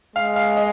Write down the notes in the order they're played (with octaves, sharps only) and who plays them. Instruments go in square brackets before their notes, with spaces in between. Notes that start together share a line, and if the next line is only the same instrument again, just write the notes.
[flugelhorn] G#3 [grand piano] F5
[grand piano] F5
D#5